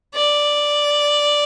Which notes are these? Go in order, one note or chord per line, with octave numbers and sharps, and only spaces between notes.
D5